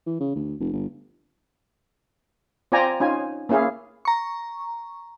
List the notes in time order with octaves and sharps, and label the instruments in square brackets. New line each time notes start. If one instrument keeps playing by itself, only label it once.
[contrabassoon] E3
C#3
D2
F1
G1
[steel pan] C4 F4 D5 G5 G#5 A#5
C#4 D#4 F4 G#5
A#3 C#4 E4 G#4 F5
[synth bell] A#5 C#6